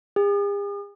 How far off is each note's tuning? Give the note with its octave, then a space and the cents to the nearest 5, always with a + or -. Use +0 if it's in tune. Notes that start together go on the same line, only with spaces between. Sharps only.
G#4 -45